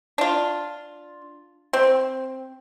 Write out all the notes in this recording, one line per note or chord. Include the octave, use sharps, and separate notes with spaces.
D4 F4
C4